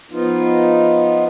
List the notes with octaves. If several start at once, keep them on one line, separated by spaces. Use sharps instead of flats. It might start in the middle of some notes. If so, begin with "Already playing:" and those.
F3 B3 D#4 F4